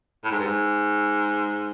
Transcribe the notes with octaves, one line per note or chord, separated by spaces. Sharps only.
A2
G#2
G2
G#2